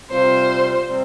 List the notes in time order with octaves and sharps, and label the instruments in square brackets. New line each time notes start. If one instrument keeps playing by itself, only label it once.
[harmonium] C3 G3 C4 F4 [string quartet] C5
[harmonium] C3 G3 C4